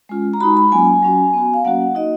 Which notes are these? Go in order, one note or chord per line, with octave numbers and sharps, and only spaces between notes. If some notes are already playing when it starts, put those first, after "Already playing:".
G#3 C#4 F4
A#5
G#3 D#4 F#4 B5
B5
F#3 A#3 C#4 F4 G#5
F#3 C#4 F#4
B3 F#4
F5
F#3 A#3 C#4 F#4 F#5
A#3 D#4 F#4 D#5